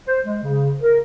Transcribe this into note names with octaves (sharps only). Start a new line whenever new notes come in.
C5
G#3
C#3
A#4